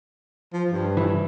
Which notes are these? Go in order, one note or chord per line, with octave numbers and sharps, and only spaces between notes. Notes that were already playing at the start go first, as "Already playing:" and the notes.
F3
G2
E3